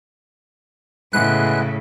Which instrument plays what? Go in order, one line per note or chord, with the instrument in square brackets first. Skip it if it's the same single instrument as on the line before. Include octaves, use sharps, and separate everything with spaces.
[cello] A2 C#3 [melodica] G#3 B3 E4 [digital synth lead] F#6